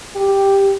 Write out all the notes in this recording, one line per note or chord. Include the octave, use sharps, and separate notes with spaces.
G4